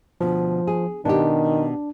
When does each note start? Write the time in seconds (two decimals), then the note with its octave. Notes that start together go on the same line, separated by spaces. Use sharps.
0.21 D2 B2 F3
0.67 G#4
1.05 B2 D#3 D4 G4